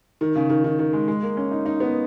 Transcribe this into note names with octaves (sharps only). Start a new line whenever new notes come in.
D#3
C#3
D#3
D#3
D#3
G#3
G#3
A#3
C#4
D#4
D#4
B3